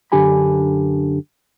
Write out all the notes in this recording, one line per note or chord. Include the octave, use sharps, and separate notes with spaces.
F#2 D3 D4 G4 G#5 B5